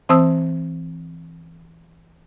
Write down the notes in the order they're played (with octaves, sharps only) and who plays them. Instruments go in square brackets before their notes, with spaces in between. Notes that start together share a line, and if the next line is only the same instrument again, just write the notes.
[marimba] E3 C4 C5 A5 D#6 E6